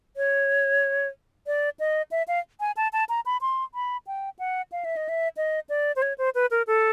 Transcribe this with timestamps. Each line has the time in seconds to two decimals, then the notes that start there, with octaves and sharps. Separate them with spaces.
0.17 C#5
1.47 D5
1.79 D#5
2.11 E5
2.28 F5
2.60 G#5
2.77 A5
2.93 A5
3.09 A#5
3.26 B5
3.41 C6
3.74 B5
4.07 G5
4.39 F#5
4.72 F5
4.85 E5
4.97 D#5
5.09 E5
5.37 D#5
5.69 D5
5.96 C5
6.02 C#5
6.18 C5
6.35 B4
6.51 A#4
6.67 A4